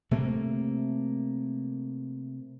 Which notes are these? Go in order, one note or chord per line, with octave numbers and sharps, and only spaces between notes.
C3 A3 A#3